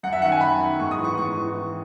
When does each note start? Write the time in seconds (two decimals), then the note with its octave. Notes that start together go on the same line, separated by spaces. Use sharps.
0.03 F#2 F#5
0.12 E5
0.22 D#3 F#5
0.32 G#5
0.41 F#2 B5
0.60 D#3
0.79 G#2 C#6
0.91 D#6
0.98 E3
1.04 C#6
1.17 G#2 C#6
1.36 E3